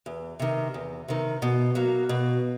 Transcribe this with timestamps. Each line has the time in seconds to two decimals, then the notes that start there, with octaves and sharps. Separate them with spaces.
0.06 E2
0.39 C3 D#3
0.74 E2
1.08 C3 D#3
1.42 B2
1.75 F#3 A#3
2.09 B2